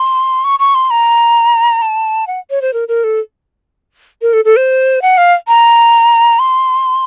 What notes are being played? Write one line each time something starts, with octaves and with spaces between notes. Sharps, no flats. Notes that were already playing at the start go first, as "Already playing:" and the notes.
Already playing: C6
C#6
C#6
C6
A#5
A5
F#5
C#5
C5
A#4
A#4
A4
A#4
A4
A4
C5
F#5
F5
A#5
C6